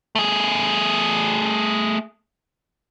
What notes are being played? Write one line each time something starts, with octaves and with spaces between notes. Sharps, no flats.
A3 G#4